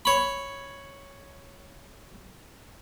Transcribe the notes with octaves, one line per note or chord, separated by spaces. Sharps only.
C#5 B5